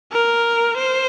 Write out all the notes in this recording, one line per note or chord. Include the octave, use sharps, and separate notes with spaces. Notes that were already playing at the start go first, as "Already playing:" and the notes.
A#4
C5